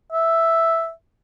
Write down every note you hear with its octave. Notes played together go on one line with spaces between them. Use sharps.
E5